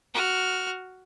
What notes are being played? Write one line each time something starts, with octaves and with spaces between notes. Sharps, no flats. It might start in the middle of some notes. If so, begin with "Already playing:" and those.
F#4 F6